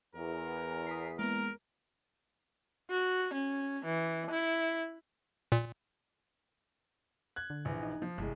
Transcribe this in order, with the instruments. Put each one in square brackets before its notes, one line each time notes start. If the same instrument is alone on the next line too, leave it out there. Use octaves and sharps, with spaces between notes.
[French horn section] E2 [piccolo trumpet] A#4
[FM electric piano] D#6 B6 C7
[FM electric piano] G#3 A#3 B3 [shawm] A#4 [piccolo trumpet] A#5
[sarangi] F#4
C#4
E3
E4
[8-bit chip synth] A#2
[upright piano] F#6 G#6
[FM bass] D3
[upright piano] A#1 E3
[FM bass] D#4
[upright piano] F3
[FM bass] G1 [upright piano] C2 G#3